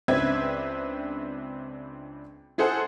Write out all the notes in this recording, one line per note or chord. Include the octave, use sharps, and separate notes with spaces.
C#2 C4 D4 B4 E5 G#6
E4 G#4 A4 C5 F#5